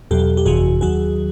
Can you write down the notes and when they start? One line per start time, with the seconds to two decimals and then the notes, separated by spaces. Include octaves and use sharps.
0.11 E2 B2 F#3 G4 A4
0.37 G4
0.46 G1 F2 C3 E3 F#4 G#4
0.81 D#2 D#3 F#3 F#4 G#4